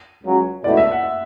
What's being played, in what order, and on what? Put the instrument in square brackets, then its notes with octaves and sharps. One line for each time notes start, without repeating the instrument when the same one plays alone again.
[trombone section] C#2 C#3 F#3 C#4
[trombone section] C#2 B2 A3 E4 [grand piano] D5
[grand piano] E5
F#5